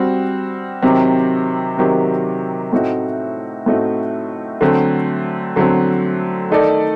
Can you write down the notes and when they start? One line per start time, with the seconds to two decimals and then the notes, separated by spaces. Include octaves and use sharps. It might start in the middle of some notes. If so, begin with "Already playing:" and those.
Already playing: G3 C4 F#4
0.82 C3 D#3 F#3 C4 G4
1.77 C3 D#3 F#3 C4 G4
2.73 A2 A3 C4 D#4 F#4
3.66 A2 A3 C4 D#4 F#4
4.61 D3 F#3 A3 C4
5.56 D3 F#3 A3 C4
6.50 D#3 A3 D#4 A4 D5